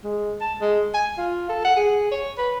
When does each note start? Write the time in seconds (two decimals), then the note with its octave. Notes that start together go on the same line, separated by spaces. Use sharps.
0.04 G#3
0.41 A5
0.61 G#3
0.94 G#5
1.18 F4
1.49 A4
1.65 F#5
1.76 G#4
2.11 C#5
2.38 B4